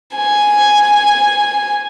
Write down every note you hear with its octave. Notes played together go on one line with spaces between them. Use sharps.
G#5